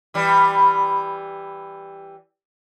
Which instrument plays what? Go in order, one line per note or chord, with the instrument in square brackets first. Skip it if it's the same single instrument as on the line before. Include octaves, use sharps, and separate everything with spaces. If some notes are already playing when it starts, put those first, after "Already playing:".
[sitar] E3 G3